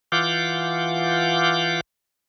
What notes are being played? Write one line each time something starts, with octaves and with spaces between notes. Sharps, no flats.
E3 F4 F5 F#5 D6 G6